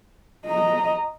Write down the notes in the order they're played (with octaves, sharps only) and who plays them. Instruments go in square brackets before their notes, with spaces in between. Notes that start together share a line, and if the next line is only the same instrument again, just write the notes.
[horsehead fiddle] D#5 A#5